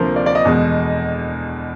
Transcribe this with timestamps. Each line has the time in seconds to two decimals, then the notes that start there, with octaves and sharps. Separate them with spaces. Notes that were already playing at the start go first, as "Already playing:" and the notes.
Already playing: D2 C3 F3 A#3 A#4 C5
0.16 D5
0.26 D5
0.35 D#5
0.45 E2 B2 G#3